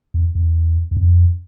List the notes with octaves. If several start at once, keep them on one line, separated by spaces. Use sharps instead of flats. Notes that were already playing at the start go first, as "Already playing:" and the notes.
E2
E2
E2
F2